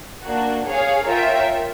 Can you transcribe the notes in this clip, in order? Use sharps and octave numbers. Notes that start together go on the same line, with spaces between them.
A#3 D4 F#4
G#4 C#5 F5
F4 A#4 C#5 E5 G5